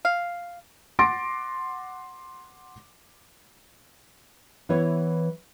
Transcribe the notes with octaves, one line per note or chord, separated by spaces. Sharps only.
F5
F#5 C6 D6 A6 A#6 D7
E3 B3 E4 C#5